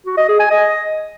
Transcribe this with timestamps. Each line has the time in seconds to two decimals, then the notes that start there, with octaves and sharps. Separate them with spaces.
0.06 F#4
0.17 D#5
0.28 G#4
0.40 G#5
0.51 D#5